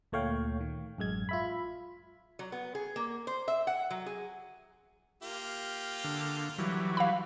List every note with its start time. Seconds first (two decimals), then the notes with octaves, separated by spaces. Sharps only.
0.12 D2 A#2 A3 C#5 F5 G5
0.60 D#3
0.98 A1 F#2 G#3 G#6
1.29 F4 E5 B5
2.39 F#3
2.52 B3
2.75 G#4
2.96 A#3
3.27 C5
3.48 E5
3.67 F#5
3.91 F#3
4.06 G#4
5.23 A#3 F4 G4
6.04 D3
6.58 E3 F#3 G3
6.97 F5 B5